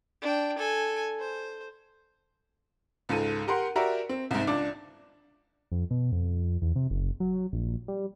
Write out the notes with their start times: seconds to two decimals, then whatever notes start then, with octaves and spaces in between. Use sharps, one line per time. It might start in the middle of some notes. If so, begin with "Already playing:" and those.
0.21 D4 G5
0.58 A4 G#5
1.19 C5
3.09 C#2 G#2 A4 D#7
3.48 G4 A#4 F#5 C6
3.76 F#4 G4 A#4 D5 E5 A#5
4.09 C4
4.31 C2 G#2
4.47 C#2 D4 D6
5.72 F2
5.91 B2
6.12 F2
6.62 E2
6.76 C3
6.91 F#1
7.20 F#3
7.53 A#1
7.88 G3